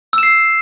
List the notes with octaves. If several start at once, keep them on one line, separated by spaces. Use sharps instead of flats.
E6 C7 E7